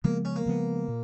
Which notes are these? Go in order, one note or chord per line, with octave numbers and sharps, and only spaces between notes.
C#3 F3 G#3 A#3 B3
C#4
A#3
C#3 F3 G#3 B3
A#2